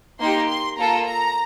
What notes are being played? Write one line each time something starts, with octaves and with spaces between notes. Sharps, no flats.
A#3 D#4 G4 C6
C6
A#3 F4 A4 A#5
A#5